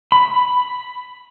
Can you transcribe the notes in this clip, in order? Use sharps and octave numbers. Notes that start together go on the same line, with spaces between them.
B5